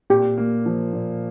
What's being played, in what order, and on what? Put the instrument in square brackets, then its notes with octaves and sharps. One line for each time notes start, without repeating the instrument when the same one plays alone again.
[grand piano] A#2 [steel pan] G4
[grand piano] A#3
F3
A#2